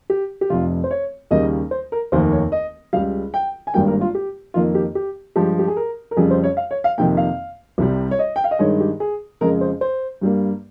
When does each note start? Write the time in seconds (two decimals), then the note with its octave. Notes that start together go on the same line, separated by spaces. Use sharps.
0.10 G4
0.41 G4
0.50 F1 F2 C3 F4
0.84 C5
0.91 C#5
1.31 D#2 C#3 G3 A#3 D#5
1.71 C5
1.92 A#4
2.12 F1 D#2 D#3 A#3 C5
2.32 C#5
2.52 D#5
2.93 C#2 C#3 G3 F5
3.34 G5
3.67 G#5
3.74 G#1 G2 G3 A#3 G5
3.88 A#4
4.01 F4
4.15 G4
4.54 F2 D#3 A#3 F4
4.75 G4
4.95 G4
5.36 G2 F3 G#3 G4
5.59 G4
5.68 G#4
5.77 A#4
6.11 A#4
6.17 F2 C#3 G3 G#4
6.31 C5
6.44 C#5
6.57 F5
6.71 C#5
6.84 F5
6.98 F2 C3 D#3 A#3 G5
7.17 F5
7.78 C2 C3 G3
8.11 C#5
8.19 D#5
8.36 G5
8.44 F5
8.51 D#5
8.59 G2 D#3 G#3 C#5
8.80 G4
9.00 G#4
9.41 F2 C#3 G#3 A#4
9.61 C5
9.81 C5
10.21 G2 G3 A#3